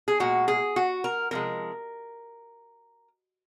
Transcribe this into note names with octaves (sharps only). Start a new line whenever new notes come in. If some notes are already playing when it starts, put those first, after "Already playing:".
G#4
A#2 G#3 F#4
G#4
F#4
A#4
C3 F3 G#3 A#4